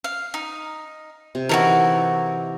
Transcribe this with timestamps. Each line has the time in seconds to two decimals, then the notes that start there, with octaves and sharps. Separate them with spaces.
0.04 F5
0.34 D#4
1.35 C3
1.49 E3 D#4 E4 F#4 A4 A#4